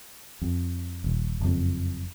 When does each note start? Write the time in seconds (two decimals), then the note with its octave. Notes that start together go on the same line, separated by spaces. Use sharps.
0.42 F2
1.04 D#1
1.40 F#1 F2